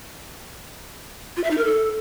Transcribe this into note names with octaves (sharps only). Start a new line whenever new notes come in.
F4
E5
D#4
A#4
A4